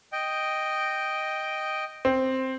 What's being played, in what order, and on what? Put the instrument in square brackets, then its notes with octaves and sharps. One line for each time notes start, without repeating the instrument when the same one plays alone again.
[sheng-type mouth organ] D#5 G5
[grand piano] C4